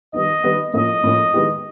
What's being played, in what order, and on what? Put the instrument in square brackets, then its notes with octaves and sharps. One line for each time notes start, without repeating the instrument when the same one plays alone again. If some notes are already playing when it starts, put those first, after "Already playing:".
[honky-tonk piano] D#3 G3 B3 D#4 [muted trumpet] D#5
[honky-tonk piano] D#3 G3 B3 D#4
[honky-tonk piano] A2 F3 A#3 C#4 [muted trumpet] D#5
[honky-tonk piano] A2 F3 A#3 C#4
D#3 G#3 B3 E4 G4